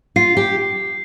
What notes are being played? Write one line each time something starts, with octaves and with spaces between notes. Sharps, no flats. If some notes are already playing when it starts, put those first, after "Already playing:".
F4 C7
G4